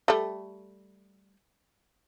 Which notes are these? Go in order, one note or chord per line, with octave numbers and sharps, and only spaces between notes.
G3 A3